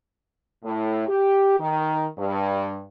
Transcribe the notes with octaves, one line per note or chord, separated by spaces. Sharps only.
A2
G4
D#3
G2